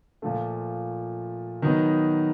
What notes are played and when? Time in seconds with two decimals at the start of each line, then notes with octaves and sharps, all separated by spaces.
0.22 A#2 F3 A3
1.62 D#3 F#3 B3 D#4